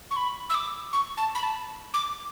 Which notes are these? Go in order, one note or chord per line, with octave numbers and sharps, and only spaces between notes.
C#6
B5
E6
D6
C#6
A5
B5
A5
D6